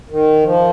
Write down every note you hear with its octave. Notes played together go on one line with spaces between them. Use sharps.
D#3
F3